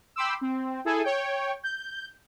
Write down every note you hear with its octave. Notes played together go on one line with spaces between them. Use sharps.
G5 B5 C6 D6 E6
C4
E4 G#4 A4 G#5
C#5 G5
G6